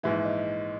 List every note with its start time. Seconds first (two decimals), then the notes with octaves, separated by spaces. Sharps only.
0.03 A#1 G#2 E3 E5
0.25 D#5